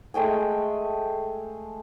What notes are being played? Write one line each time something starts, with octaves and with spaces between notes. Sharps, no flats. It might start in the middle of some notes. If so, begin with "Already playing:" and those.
G#3 A3 G5 G#5